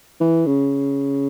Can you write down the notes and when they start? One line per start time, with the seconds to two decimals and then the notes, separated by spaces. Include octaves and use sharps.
0.20 E3
0.46 C#3